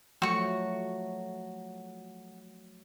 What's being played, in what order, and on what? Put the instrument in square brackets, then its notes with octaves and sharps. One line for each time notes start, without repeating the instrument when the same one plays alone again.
[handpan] F3 F#3 A3 [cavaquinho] F#4 C#6